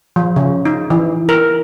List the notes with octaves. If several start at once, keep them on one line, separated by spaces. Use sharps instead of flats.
F3
C#3
D#4
E3
A#4